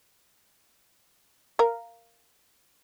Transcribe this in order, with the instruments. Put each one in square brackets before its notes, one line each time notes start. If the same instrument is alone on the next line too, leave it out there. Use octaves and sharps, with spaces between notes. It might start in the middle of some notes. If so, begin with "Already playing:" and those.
[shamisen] A#4 F5